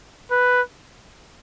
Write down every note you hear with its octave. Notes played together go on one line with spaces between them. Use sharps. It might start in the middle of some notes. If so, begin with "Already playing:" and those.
B4